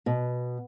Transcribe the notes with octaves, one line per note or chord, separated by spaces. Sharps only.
B2